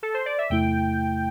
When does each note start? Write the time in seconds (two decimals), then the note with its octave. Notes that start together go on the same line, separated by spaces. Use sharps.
0.03 A4
0.14 C5
0.26 D5
0.39 E5
0.50 E2 C3 A3 E4 G5